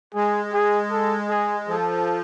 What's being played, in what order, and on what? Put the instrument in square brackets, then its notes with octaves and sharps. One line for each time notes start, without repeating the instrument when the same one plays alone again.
[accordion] G#3 [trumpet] G#4
[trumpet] G#4
A4
G#4
[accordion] F3 [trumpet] A4